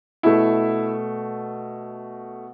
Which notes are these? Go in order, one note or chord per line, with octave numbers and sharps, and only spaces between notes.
B2 A3 E4